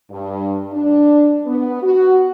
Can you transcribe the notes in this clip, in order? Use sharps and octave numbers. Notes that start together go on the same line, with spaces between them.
G2
D4
B3
F#4